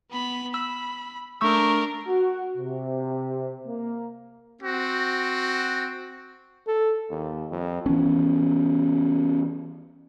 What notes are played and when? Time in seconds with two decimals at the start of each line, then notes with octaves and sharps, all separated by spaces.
0.11 B3 B5
0.54 B5 E6
1.41 A3 D4 A#4 C#6 E6
2.08 F#4
2.57 C3
3.66 A#3
4.61 C4 F#4
6.67 A4
7.10 D#2
7.51 F2
7.86 E3 B3 C#4